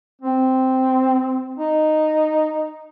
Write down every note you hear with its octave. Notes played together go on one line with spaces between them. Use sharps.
C4
D#4